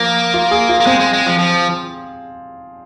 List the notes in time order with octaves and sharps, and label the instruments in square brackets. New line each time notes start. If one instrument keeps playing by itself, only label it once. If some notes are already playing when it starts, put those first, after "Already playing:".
Already playing: [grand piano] F3 [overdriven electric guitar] A#3
[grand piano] F4
G#4
F4
[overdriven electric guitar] A#3
[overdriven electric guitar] G#3 [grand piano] C4
[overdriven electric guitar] G#3
G#3
F3
F3